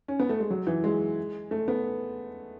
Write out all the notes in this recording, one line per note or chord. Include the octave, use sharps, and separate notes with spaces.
C#4
B3
A3
G#3
F#3
E3
G#3
A3
B3